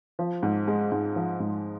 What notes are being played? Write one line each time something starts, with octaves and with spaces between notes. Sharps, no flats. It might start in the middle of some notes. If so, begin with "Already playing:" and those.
F3
G#2
G#3
G#2
F3
G#2